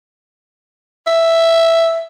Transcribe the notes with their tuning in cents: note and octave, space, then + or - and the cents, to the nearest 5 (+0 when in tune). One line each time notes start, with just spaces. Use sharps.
E5 +5